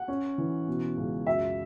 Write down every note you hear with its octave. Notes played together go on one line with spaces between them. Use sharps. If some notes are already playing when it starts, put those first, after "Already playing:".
Already playing: F#5
C#4
E3
B2
C#2
F#2 E5